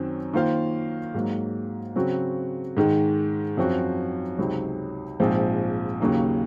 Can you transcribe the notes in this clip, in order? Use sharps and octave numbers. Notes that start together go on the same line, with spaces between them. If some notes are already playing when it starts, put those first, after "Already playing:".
Already playing: F#2 D#3 F#3 C4
D#3 A#3 F4 C5 F5
G#2 F#3 A#3
C#3 F#3 C4 F#4
G#2 D#3 G#3
F#2 F3 C4 F#4
C#2 C3 F#3 C4 D#4
A#1 G#2 F3 C4
D#2 C#3 F#3 A#3 D#4